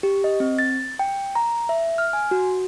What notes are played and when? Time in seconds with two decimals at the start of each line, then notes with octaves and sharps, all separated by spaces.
0.03 G4
0.24 D#5
0.40 C4
0.59 A6
0.99 G5
1.35 A#5
1.69 E5
1.98 F6
2.13 G#5
2.31 F#4